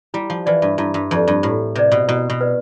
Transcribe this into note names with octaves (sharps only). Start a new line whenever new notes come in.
G3 E4
F3
E3 B4 D5
G2
G2 E4
G2
F2 B4 D5
G2
A2 E4
C3 B4 D5
B2
B2 E4
B2
B4 D5